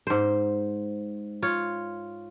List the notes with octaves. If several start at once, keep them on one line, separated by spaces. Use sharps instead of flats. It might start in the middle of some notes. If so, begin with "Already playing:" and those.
G#2 C5
F4 C#5